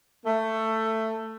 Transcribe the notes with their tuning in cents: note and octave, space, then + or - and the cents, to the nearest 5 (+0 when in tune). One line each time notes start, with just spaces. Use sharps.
A3 +15